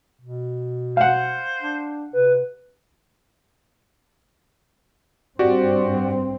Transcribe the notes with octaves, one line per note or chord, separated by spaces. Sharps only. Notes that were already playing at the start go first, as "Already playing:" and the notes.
B2
C5 F5 F#5
D4
C3 B4
G2 C4 F#4 G4 D5